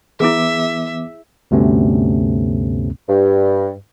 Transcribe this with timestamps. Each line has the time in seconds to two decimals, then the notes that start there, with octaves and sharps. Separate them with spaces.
0.20 E3 B3 E4 G#4 E5 D6
1.51 D2 G2 C3 A3 B3 C#4
3.07 G2